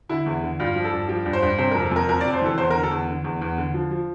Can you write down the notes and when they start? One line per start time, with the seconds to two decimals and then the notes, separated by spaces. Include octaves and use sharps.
0.09 D3 E4
0.26 E2
0.42 D3
0.59 G2 F4
0.76 F3
0.85 A4
0.92 G2
1.09 F3 G4
1.25 G2
1.33 C5
1.42 G2
1.58 C3 C5
1.71 A#4
1.75 F2
1.84 A4
1.91 F2 A#4
2.09 F2 A#4
2.21 D5
2.25 C3
2.33 C5
2.42 E3 A4
2.58 E2 C5
2.70 A#4
2.75 D3
2.83 A4
2.91 E2
3.09 D3
3.24 E2
3.41 E2
3.58 D3
3.74 F3
3.91 F3